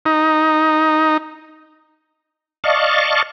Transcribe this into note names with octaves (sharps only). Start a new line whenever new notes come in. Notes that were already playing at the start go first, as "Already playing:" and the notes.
D#4
D5 D#5 F5 A5 C#6